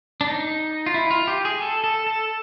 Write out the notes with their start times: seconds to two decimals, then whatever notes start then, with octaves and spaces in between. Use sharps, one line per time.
0.21 D4
0.27 D#4
0.86 F4
0.94 E4
1.11 F4
1.27 G4
1.45 G#4
1.62 A4
1.84 A4
2.07 A4